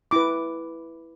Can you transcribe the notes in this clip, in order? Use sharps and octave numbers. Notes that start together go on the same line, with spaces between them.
E4 B4 D6